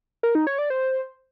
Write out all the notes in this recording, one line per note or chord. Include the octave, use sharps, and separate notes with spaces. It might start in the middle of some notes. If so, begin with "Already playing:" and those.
A#4
D#4
C#5
D5
C5